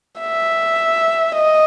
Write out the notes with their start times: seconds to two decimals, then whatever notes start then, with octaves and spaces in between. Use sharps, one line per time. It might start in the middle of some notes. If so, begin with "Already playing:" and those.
0.20 E5
1.36 D#5